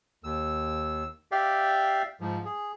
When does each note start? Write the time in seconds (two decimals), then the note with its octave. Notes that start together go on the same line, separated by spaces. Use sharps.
0.24 D#2 E6
1.32 G4 D5 E5 F5 G5
2.20 G#2 F3
2.45 G#4